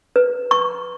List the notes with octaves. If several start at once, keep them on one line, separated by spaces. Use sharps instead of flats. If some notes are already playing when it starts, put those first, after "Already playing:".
B4
C#6